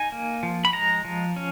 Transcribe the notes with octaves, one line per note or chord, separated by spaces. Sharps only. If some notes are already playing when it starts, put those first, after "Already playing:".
Already playing: D#4 G#5
A#3
F3
B5
G#3 A#5
F3
C#4